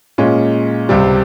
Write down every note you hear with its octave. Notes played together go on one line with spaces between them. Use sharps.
A#2 G#3 C#4
C#2 C3 G3